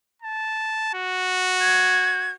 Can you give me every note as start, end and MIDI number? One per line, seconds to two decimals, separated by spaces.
0.22 0.94 81
0.94 2.35 66
1.61 2.31 92